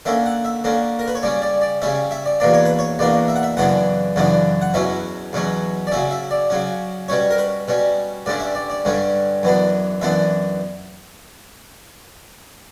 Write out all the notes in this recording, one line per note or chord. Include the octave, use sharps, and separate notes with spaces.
D3 A#3 C#4 E5
F#5
E5
D3 A#3 C#4
A#4
B4
C#5
C#3 G3 C#4 D5
D5
D5
C#3 G3 C#4 E5
E5
D5
E2 B2 A#3 D4 D5
C#5
B4
C#5
E2 B2 A#3 D4 D5
E5
F#5
E5
F#2 C#3 E3 B3 D4 F#5
F#2 C#3 E3 B3 D4
F#5
E2 B2 F#3 C#4 E5
E2 B2 F#3 C#4
D5
C#3 F#3 C#4 E5
E5
D5
C#3 F#3 C#4
B2 G3 C#4 C#5
A#4
B4
B2 G3 C#4
G2 D3 G3 C#4 D5
E5
D5
D5
G2 D3 G3 C#4
F#2 E3 B3 D4
F#2 E3 B3 D4 E5